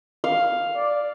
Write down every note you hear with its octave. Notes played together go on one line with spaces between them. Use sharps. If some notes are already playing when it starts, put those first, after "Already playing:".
F5
D5